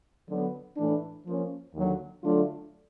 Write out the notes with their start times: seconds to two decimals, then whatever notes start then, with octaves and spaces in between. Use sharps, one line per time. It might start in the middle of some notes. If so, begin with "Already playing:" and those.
0.28 D3 F#3 B3
0.77 A2 E3 A3 D4
1.25 F3 A#3 C#4
1.74 D#2 D3 F#3
2.23 D3 F#3 A3 D4 F4